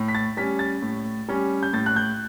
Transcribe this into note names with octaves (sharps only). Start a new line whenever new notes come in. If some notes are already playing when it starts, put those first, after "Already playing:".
Already playing: A2
B6
A6
G3 C#4 B6
A6
A2
G3 C#4
G6
A2 A6
F#6
G6